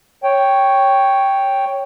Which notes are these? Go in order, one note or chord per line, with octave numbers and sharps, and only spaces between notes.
C#5 G5